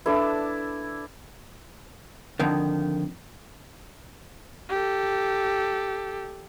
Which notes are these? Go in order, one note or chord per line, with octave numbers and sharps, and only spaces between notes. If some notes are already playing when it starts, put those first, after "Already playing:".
D4 E4 A4 B4 D5
F2 D3 D#3
G4 A4